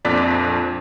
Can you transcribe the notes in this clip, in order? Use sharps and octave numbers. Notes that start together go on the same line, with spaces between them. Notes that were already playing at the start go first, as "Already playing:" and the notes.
A#1 F2 D5 F#6 A6 B6